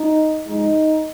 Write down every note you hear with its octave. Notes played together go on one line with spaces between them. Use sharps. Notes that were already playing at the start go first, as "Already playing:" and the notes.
Already playing: D#4
G#2 F3 G#3 D#4